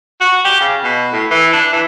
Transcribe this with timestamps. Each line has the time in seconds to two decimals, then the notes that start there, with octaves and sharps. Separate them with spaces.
0.21 F#4
0.45 G4
0.61 C#3
0.84 B2
1.13 A2
1.31 E3
1.53 D4
1.73 E3